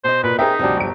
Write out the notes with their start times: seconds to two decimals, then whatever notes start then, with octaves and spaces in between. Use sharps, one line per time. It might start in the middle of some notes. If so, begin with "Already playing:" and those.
0.04 B2 C5 D#5
0.23 A#2 B4
0.39 C4 D#4 G#4 A#4 E5
0.59 D2 C3 F3 G3 D4
0.77 G1 D7